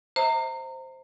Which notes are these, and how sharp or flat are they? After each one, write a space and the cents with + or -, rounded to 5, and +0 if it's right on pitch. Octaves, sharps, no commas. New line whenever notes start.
C5 +0 E5 -40 A#5 -30